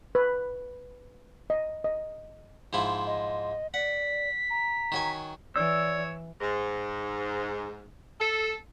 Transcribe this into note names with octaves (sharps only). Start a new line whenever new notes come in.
B4
D#5
D#5
G#2 F3 E4
D#5
D5 F#5 B6
A#5
D#3 F#3 G#5
E3 C#5 D5 E6
G#2
A4